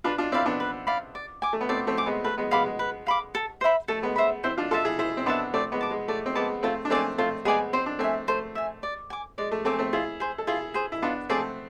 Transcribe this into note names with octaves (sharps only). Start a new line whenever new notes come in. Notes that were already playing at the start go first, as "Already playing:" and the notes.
D4 F4 B4
D4 F4
C4 E4 D5 F5 B5
B3 D4
B4
D5 F5 B5
D5
G#5 D6
A3
B3
A3 C4 D5
A3 C4
G#5 D6
G#3 B3
A3 B4
G#3 B3
G#3 B3 F5 B5 D6
G#3
B4
F5 B5 D6
A4
C5 E5 B5
A3 A4
G#3 B3
C5 E5 B5
C4 E4 C5
D4 F4
F4 A4 E5 A5 C6
E4 G#4
E4 G#4 C5
C4
B3 D4 E5 A5 C6
A3 C4 D5
G#3 B3
A5 D6
G#3
A3 D5
C4
G#3 B3 A5 D6
A3 C4 F4
D4
A3 C4 G#4 D5 G#5
A3 C4 F4
G#3 B3 G#4 D5 G#5
C4 C5
D4
A3 C4 E5 G#5
A3 C5
E5 G#5
D5
G#5 D6
G#3 D5
A3
A3 C4 G#5 D6
A3 C4
E4 F4 G#4
G#4 C5
A4
E4 F4 G#4
G#4 C5
E4
B3 D4 F4
A3 C4 G#4 D5 A5